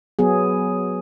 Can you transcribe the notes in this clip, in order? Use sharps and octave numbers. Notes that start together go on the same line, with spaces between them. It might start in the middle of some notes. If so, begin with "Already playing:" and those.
F#3 B3 G#4